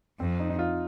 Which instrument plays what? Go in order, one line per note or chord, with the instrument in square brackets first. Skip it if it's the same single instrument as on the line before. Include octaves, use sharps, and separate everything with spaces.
[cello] F2 [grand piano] C4
[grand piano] D#4
D#4
F4